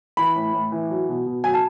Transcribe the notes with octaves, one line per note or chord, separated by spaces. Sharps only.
E3 B5
A2
A2
E3
F#3
B2
B2
F#3 G#5
A5